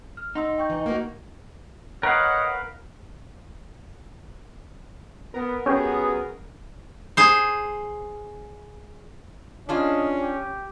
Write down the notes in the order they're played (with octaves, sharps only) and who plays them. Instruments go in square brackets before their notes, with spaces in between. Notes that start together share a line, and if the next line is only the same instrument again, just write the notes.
[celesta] F6
[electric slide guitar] D#4 [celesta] F#5 C6 E6
[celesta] G5 C#6 G6
[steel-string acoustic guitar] E3
A#3 D#4 F#4
[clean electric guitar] A#4 B4 F5 [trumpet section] C#5 D#5 F#5
[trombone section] B3 [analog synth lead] A#4
[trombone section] F#2 B3 G#4 [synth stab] C#4 G4
[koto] G#4 C5
[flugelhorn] C#4 [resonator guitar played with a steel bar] D4 F4 G#4 [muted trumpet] D#5
[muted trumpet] G4